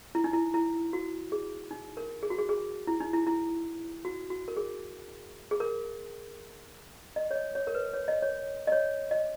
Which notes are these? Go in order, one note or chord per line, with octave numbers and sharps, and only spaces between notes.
E4
D#4
E4
E4
F#4
G#4
D#4
A#4
G#4
F#4
G#4
G#4
E4
D#4
E4
E4
F#4
F#4
A#4
G#4
G#4
A#4
D#5
C#5
D#5
C#5
A#4
B4
C#5
D#5
C#5
D#5
C#5
D#5